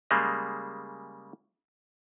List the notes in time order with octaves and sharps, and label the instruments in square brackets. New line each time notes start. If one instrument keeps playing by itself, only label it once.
[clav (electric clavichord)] C#3 G3 G#3 A#3